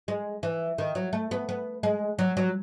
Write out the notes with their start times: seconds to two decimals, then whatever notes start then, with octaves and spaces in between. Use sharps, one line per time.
0.08 G#3
0.43 E3
0.78 D#3
0.95 F#3
1.13 A3
1.31 B3
1.49 B3
1.83 G#3
2.19 F#3
2.37 F#3